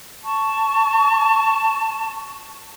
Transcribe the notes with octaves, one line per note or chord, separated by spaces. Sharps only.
A5 C#6